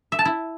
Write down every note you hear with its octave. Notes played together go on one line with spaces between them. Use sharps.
E5
A5
E4